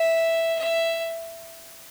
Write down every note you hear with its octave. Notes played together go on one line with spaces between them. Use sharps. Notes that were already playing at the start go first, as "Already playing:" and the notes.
Already playing: E5
E5